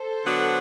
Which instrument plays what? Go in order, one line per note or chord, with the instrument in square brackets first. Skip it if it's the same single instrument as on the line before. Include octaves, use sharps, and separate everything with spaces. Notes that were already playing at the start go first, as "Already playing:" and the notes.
Already playing: [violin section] A4 C5
[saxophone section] D3 F#3 B3 D4 F#4